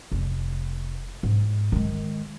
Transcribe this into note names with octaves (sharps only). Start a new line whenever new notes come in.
F1
G#2
D#3 G#3